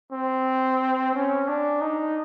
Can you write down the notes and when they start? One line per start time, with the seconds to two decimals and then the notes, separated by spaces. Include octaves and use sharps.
0.12 C4
1.15 C#4
1.48 D4
1.81 D#4